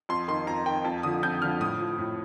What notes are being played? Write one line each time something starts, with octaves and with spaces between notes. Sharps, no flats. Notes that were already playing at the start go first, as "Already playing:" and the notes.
F2 C6
D#3 C6
F2 A#5
D#3 G5
F2 A5
D3 F3 D#6
F2 G6
D3 F3 F6
A2 D#6
F3
A2